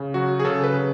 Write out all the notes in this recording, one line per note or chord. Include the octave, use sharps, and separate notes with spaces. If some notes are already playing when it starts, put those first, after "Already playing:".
Already playing: C#3
F#3 F#4
G#4
C#3 A4
B4
C#3